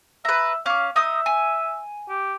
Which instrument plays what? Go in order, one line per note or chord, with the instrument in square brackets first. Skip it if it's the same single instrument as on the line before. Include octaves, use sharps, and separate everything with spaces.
[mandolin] B4 A#5 [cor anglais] E5
[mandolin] C#4 D6 [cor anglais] F5
[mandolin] D#4 D#6 [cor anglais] E5
[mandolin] G#5
[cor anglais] G4